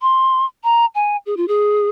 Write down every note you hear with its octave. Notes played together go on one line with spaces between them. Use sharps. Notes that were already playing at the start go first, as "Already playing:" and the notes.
C6
A#5
G#5
G#4
F4
G#4